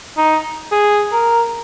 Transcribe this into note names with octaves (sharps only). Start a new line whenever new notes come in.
D#4
G#4
A#4